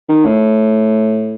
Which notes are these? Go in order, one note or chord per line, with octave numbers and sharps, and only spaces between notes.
D#3
A2